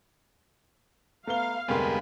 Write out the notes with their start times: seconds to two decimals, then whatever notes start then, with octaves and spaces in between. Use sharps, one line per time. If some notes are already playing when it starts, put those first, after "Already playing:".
1.27 A3 B3 F5 A#5 G7
1.68 F1 D2 G3 G#3 B3 A#4 C6